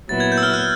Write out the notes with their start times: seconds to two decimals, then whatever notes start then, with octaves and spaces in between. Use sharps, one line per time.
0.09 A#2 F#3 B3 E4 A6
0.20 G#6
0.32 G6
0.38 E6
0.43 F6
0.54 F#6